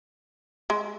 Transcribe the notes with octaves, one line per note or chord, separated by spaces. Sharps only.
G#3